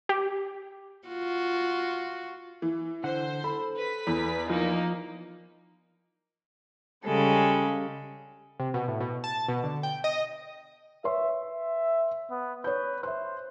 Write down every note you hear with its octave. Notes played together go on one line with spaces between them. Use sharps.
G4
F4 F#4
E3
D3 C5 F#5
A4 B5
B4 B6
E2
F3 A#3 D#4 F4
C#3 G3 G#3 A4
C3
B2
A2
B2
A5
B2
D3
G5
D#5
B4 C#5 E5 C6
E5
B3
B4 C#5 G6
C5 E5 F#6